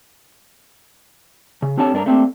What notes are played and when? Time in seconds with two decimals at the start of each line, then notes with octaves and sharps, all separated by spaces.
1.62 C#3
1.77 C4 D4 G4 A4 C#5 A5
1.94 G2 D4 A#4 D5 A#5
2.06 A3 A#3 C4 D4 G4